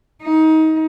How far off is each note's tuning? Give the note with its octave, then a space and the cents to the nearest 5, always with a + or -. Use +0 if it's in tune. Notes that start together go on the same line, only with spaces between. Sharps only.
D#4 +25